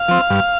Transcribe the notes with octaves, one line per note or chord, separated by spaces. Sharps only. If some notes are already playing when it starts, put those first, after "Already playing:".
Already playing: F5
F3 C4
G2